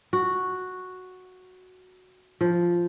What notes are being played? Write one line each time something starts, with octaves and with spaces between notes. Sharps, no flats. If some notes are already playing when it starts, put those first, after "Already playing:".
F#4
F3